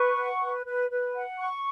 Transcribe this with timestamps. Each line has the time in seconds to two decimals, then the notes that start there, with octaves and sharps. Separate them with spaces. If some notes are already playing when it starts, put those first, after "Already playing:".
Already playing: B4 C#6
0.18 F#5
0.42 B4
0.66 B4
0.90 B4
1.15 F#5
1.38 C#6